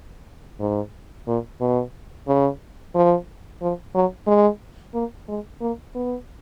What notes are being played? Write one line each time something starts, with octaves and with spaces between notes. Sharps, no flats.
G#2
A#2
B2
C#3
F3
F3
F#3
G#3
A#3
G#3
A#3
B3